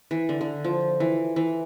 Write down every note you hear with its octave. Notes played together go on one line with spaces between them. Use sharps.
E3
D3
D3
F3
E3
E3